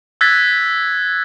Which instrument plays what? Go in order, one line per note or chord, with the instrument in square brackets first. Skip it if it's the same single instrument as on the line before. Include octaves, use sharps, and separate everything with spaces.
[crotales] E6 F#6 G#6 A6 B6